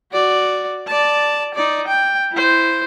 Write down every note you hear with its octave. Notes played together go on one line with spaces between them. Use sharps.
F#4 D5
D5 A5
D#4 D5
G5
E4 C5